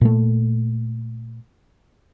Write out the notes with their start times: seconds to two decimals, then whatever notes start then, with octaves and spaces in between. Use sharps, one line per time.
0.01 A#2 A3